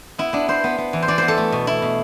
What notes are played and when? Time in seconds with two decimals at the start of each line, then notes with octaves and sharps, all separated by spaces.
0.18 B3 E4
0.33 B3 D4
0.48 D4 C5
0.64 B3
0.78 B3
0.93 E3
1.02 C5
1.08 E3 D5
1.18 B3 C5
1.28 A4
1.38 A3
1.52 B2
1.67 B2 E4
1.82 B2